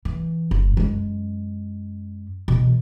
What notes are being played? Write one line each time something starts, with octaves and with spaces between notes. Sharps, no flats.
E3
F#1
F#2 G#3
B2 E3